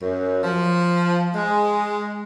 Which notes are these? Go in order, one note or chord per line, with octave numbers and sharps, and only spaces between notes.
F#2
F3
G#3